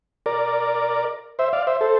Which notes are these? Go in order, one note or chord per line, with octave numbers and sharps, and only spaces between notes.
A#4 D5
C5 E5
D5 F5
C5 E5
A4 C5